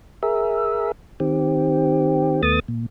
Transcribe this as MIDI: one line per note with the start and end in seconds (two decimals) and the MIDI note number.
0.23 0.92 68
0.23 0.92 70
0.23 0.92 76
1.20 2.42 51
1.20 2.42 60
1.20 2.42 67
2.43 2.60 39
2.43 2.60 57
2.43 2.60 59
2.43 2.60 87
2.43 2.60 93
2.68 2.86 46